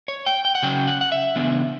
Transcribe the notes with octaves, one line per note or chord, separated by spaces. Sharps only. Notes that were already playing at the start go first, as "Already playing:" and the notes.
C#5
G5
G5
F#5
C#3 F#3 C#4 G5
F#5
F#5
E5
C#3 E3 B3 D4